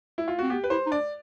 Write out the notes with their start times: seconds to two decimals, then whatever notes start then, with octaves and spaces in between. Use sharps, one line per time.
0.18 E4
0.28 F4
0.39 C4 F#4
0.50 B3 G4
0.64 B4
0.70 E4 C5
0.86 D#4
0.92 D4 D5